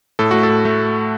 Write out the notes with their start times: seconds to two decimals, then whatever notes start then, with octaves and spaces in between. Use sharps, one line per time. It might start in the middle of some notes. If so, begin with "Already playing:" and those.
0.19 A2 A4
0.31 A3 F#4
0.43 A4
0.49 A2
0.65 A3